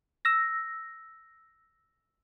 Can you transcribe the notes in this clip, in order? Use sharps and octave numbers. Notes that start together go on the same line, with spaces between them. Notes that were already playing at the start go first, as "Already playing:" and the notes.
E6 A#6